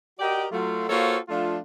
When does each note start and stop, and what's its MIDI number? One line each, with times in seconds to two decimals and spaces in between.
0.19 0.46 66
0.19 0.46 67
0.19 0.46 70
0.19 0.46 74
0.19 0.46 75
0.19 0.46 79
0.52 0.89 54
0.52 0.89 57
0.52 0.89 65
0.89 1.17 58
0.89 1.17 65
0.89 1.17 66
0.89 1.17 69
0.89 1.17 72
0.89 1.17 73
1.29 1.58 53
1.29 1.58 57
1.29 1.58 62
1.29 1.58 65